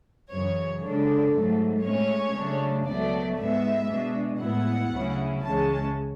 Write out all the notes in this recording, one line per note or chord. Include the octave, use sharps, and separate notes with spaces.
F#2 C#3 E3 C#5
C#3 G#3 D4 A4
G#2 F#3 A3
A2 G#3 C#4 C#5
C#3 F#3 A3 D4
C#2 B2 F#3 A3 D5
G#2 G#3 B3 E5
B2 G#3 D4
A2 G#3 B3 E4 F#5
D2 C#3 F#3 C#4 E4
C#2 C#3 E3 G#3 C#4 A5